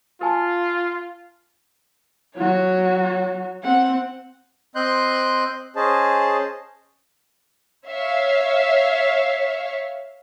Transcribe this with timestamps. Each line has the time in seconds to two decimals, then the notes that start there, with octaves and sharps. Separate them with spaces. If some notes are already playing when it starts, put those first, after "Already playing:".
0.21 F4 A#4 G#5 A5
2.36 F#3 F#4 C#5
3.63 C4 F#5
4.75 C4 D#5 C6 F#6 G6
5.76 C#4 G#4 C5 D#5 A5
7.88 C#5 E5 F5